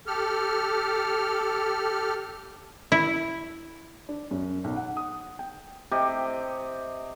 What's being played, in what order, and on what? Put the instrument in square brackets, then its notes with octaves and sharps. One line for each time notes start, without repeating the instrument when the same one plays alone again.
[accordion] G4 A4 F6
[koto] E4
[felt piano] D4
F#2
B1
F#5
D#6
G5
[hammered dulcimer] C3 G4 D#5